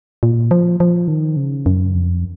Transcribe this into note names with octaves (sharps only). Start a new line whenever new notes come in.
A#2
F3
F3
D#3
C#3
F#2
F2